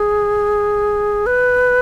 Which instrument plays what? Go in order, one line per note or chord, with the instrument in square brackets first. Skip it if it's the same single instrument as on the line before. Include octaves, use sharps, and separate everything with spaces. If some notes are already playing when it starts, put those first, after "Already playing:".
Already playing: [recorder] G#4
B4